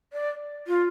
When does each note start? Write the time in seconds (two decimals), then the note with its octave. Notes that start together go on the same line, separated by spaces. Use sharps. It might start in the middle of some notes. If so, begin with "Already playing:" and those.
0.13 D5
0.67 F4